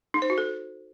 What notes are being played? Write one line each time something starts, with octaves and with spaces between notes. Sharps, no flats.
D#4
C5
F#4
A4